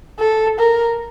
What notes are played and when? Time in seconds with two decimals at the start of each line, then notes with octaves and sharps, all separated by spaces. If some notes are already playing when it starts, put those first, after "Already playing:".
0.19 A4
0.59 A#4